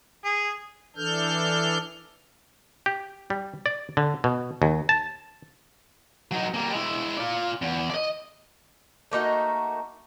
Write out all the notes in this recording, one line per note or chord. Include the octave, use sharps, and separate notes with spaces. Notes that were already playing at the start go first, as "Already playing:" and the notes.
G#4
E3 D4 A4 F6 G6
G4
G3
D5
D3
B2
D#2
A5
F#3 D#4
G3 A#3
G#3 E4
F4 D5
E2
D5 D#5
A3 A#3 D#4 F#4